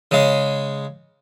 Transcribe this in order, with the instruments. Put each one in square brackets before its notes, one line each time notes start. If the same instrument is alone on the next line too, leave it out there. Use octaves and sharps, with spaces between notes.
[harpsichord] C#3 G#3